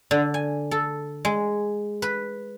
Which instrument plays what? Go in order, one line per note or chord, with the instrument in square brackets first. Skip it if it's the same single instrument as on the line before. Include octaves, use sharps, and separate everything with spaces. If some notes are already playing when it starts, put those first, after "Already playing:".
[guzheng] D3
G#5
A4
G#3
B4